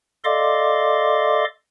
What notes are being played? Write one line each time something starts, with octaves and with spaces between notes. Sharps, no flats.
A4 D5 D#5 F5 C6 D6